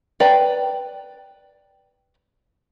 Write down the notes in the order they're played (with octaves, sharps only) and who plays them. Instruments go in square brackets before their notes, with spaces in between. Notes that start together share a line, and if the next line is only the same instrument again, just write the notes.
[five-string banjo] B4 D5 G5 A#5